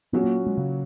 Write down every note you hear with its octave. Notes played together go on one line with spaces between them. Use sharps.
A#2 F#3 B3 C#4 F#4
A#3
G#3
C#3